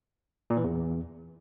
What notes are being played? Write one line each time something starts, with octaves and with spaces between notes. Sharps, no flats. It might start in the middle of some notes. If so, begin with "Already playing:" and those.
A#2
E3
E2